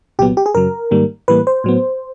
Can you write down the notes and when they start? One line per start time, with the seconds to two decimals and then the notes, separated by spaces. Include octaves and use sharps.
0.19 C2 A#2 F#3 B3 G4
0.37 G4
0.46 G#4
0.55 F#2 C#3 F#3 A#4
0.91 G#2 D#3 G3 A#3
1.28 A2 E3 G3 A#3 B4
1.47 C5
1.64 A2 F#3 B3